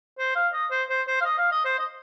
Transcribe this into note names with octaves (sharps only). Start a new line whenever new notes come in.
C5
F5
D#5
C5
C5
C5
F5
D#5
F5
D#5
C5
D#5